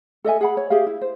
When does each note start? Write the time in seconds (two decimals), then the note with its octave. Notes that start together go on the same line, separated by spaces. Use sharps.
0.25 A4 D#5 E5 G#5
0.41 G#4 F#5 B5
0.57 C#5
0.70 G4 G#4 E5 F5
0.86 E4
1.01 C5